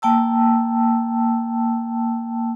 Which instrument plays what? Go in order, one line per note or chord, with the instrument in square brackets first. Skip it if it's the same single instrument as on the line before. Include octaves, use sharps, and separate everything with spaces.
[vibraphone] A#3 G5 A5 E6